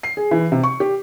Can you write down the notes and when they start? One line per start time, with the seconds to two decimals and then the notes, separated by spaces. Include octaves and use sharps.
0.03 C7
0.17 G#4
0.31 E3
0.52 C3
0.63 C#6
0.80 G4